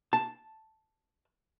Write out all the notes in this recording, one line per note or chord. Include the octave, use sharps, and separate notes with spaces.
A5